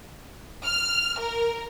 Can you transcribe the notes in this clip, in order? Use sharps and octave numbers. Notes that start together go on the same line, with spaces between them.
F6
A#4